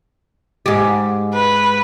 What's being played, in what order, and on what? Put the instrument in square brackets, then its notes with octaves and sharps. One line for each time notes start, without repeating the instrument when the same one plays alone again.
[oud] G#2 G4
[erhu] B4